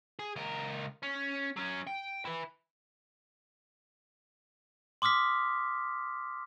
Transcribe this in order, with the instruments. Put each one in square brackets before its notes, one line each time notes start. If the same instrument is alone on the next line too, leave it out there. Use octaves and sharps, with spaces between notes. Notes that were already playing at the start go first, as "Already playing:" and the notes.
[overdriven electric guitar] G#4
C#2 A#4
C#4
F#3 C#4
G5
E4 B4
[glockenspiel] C6 D6 D#6 F6 B6